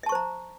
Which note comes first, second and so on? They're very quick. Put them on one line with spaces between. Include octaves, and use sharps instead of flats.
E5 A5 C#6 C5 A#5